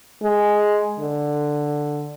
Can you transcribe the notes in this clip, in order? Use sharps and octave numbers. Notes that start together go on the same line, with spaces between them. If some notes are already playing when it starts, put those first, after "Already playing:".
G#3
D3